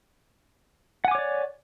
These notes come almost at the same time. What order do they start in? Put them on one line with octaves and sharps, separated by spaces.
F#5 G#5 D6 C#5 D5